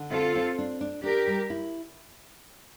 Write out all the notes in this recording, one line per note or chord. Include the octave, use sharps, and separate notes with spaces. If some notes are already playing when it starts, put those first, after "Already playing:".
Already playing: D3
C4 F4 A4
C4
D4
D4
D4 G4 A#4
G3
E4